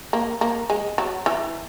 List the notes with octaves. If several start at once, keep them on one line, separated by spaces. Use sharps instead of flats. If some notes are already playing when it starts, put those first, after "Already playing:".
A#3
A#3
G#3
F#3
E3